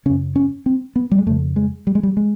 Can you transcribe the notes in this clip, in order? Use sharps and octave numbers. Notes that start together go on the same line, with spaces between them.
F#2 C#3 C#4
C#4
C4
B3
G3
G#3
F2 C#3 A3
G#3
G3
G#3
G3
G#3